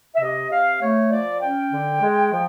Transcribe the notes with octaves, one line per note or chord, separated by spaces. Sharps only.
E5
C3 D#5
C3 F5
A3 C#5
F3 D5
C#4 G5
D3
G#3
F3